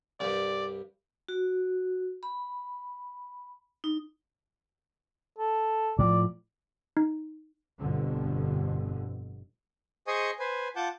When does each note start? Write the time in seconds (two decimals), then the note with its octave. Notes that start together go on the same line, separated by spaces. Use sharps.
0.20 C2 G2 D5
1.28 F#4
2.23 B5
3.84 D#4
5.39 A4
5.99 A2 F3 D5
6.97 D#4
7.79 G1 F2 B2 D3
10.07 G#4 C5 D#5 G#5 C#6 D#6
10.39 B4 C5 G#5
10.76 F4 F#5 A5 D6 G6